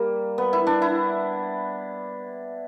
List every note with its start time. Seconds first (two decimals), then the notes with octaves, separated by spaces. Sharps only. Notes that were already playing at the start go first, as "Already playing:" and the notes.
Already playing: G3 A#3
0.38 B3
0.53 E4
0.67 D4
0.82 E4